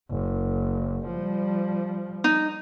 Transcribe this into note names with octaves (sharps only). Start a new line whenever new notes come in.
F#1
F3 G3
D#4